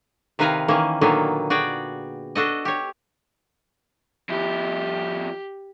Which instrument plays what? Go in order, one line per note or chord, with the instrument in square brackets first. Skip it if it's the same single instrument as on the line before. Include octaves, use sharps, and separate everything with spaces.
[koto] C3 D#3 B4 F5 G#5 A#5
D#3 E3 A#3 C#4
A#2 D3 D#3 F#3 A#3 B3
F#4 G#4 D5 G5
D4 F#4 A4 D#5
G4 C#5
[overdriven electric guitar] F2 E4 [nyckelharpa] G4